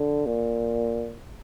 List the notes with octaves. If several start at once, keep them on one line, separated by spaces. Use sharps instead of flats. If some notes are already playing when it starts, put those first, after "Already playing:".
Already playing: D3
A#2